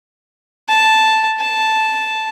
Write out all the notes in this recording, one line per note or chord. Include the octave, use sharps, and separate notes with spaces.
A5
A5